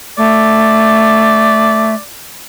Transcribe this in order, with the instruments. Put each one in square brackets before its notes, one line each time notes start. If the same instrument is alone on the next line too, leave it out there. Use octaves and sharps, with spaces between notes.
[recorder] A3 [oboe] D5